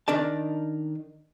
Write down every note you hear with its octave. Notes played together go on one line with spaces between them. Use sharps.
D#3 D4 D5 A5